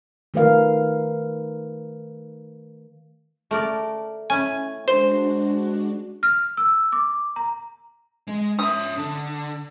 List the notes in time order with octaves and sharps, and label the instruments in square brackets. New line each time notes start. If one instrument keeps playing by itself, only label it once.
[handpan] D#3 A3 A#4 B4 F5
[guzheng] A3 A#4 D5
[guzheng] C#4 E4 [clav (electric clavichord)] G#5
[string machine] G#3 D4 F#4 [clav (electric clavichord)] C5
[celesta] F6
E6
D6
A#5
[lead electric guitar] G#3
[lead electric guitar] C#4 E5 [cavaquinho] D#6
[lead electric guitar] D3